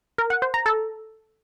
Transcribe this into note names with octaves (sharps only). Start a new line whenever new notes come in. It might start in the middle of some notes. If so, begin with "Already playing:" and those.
A#4
F#5
C5
A#5
A4